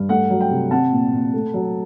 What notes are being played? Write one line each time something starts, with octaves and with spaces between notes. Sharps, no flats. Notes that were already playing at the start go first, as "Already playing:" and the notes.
Already playing: G2
A3 F#5
F#3
G5
C3
C4 F#5 A5
A#2
A#2
A3
F#3